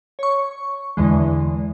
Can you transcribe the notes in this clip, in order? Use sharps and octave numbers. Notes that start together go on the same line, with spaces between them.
C#5 C#6
E2 D3 E3 G#3